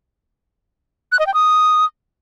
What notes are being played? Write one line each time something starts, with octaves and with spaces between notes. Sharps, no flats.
F#6
D#5
G5
D#6